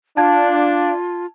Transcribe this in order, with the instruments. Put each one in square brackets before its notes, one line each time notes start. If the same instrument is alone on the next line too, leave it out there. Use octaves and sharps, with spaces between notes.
[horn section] D4 [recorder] F4 [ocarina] F5 [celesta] A5 G#6